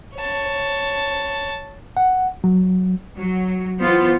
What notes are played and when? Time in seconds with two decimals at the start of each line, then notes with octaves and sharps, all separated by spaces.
0.16 C#5 A5
1.97 F#5
2.44 F#3
3.17 F#3
3.81 E3 B3 F4 C5